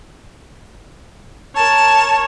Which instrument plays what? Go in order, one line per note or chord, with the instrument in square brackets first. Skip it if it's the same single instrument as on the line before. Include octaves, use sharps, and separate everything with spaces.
[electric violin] A#4 C#5 [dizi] A5